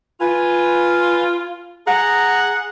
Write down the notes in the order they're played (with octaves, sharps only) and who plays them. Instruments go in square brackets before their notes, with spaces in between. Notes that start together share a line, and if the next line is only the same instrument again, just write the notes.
[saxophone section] F4 [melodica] B4 G#5
[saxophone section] G#4 F#5 [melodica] A#5